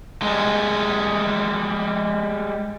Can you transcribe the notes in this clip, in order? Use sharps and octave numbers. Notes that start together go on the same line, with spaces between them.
G3 G#3